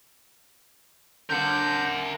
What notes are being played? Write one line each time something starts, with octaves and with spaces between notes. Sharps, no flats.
D3 A#3 A#4 F#5 G6